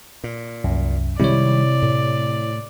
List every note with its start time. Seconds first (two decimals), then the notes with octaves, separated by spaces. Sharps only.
0.24 A#2
0.64 C2 F#2
1.20 C3 D#3 G3 G#3 E4 C#5 D5
1.82 A2